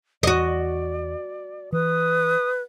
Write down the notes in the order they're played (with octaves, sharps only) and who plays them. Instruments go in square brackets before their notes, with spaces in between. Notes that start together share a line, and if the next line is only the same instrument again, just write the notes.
[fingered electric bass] E2 [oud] F#4 D#5 [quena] D5
[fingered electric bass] E3 [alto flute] B4 [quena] D#6